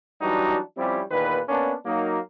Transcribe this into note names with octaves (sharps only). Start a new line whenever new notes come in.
E3 F#3 G3 D4 D#4 F#4
F3 G3 C4 C#4 E4 G4
E2 A#2 D#3 B4
A#3 B3 C#4 D4
F#3 A#3 D#4